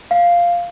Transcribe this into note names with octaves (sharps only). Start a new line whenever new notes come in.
F5